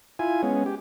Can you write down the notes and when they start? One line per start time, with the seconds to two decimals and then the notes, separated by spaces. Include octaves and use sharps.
0.19 E4 F4 G#5
0.43 G#3 B3 C#4
0.66 G4